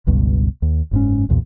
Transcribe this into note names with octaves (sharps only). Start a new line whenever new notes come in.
G1 C#2 G2 B2
D#2
F#1 G#2 C#4
B1 E2 A#2